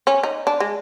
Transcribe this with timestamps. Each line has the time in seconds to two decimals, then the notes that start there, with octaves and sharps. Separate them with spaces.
0.07 C#4
0.23 D#4
0.47 D4
0.60 G#3